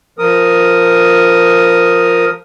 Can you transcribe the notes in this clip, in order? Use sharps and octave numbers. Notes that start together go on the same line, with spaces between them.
F3 A#4 D#6